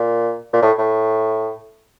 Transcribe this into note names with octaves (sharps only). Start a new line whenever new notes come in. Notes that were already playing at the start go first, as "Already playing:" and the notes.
Already playing: A#2
A#2
A2
A2